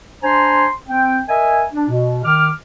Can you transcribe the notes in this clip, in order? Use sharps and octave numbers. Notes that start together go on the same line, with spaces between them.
D4 C5 G#5 A#5 C6
C4 G5
A#4 D#5 E5 G#5
D4
B2
D#3 D6 F6